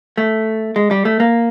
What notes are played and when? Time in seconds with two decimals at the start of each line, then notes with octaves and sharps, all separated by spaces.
0.18 A3
0.76 G#3
0.91 G3
1.05 A3
1.20 A#3